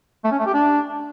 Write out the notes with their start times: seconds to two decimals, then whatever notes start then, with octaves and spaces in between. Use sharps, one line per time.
0.24 A3
0.31 C#4
0.39 A3
0.46 G4
0.54 D4